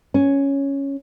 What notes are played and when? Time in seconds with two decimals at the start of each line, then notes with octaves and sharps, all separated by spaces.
0.14 C#4